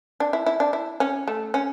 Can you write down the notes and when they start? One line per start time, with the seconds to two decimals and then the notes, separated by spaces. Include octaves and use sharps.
0.20 D4
0.33 E4
0.46 E4
0.60 D4
0.73 E4
1.00 C#4
1.28 A3
1.54 C#4